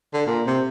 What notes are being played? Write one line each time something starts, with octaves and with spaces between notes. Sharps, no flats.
D3
A#2
C3